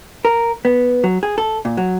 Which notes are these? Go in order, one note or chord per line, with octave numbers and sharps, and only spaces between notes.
A#4
B3
F#3
G#4
A4
A#2
F#3